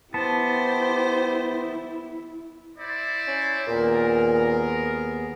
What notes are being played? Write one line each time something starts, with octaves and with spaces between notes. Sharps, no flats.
B3 E4 G4 C5 A5
E4 C5 D5
C#4
D#2 A#2 B3 G#4 A#4